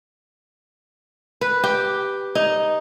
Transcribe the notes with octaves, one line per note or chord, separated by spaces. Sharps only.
B4
G4
D#4